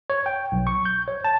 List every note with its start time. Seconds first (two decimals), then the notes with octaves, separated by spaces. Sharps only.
0.10 C#5
0.26 G5
0.52 B1
0.67 C#6
0.85 G6
1.08 C#5
1.24 A5